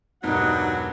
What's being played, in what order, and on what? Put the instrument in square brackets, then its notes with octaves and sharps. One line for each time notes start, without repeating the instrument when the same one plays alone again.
[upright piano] E1 G2 [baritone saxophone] F#3 [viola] G3 F#5 [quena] D#4